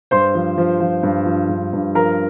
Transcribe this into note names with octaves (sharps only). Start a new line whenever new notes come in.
G2 C5 C6
F3
F3
F3
G2
F3
G2
G2
F3 A#4 A#5